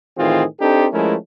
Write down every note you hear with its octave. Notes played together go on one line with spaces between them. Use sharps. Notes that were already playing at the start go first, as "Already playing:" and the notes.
A2 D#3 E3 C4 F4 G#4
C4 D4 D#4 G4 A4
F3 G#3 A3 C#4 E4 A#4